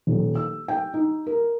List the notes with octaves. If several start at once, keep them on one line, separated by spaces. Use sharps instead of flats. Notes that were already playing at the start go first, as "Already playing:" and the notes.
D#1
E6
G5
D#4
A#4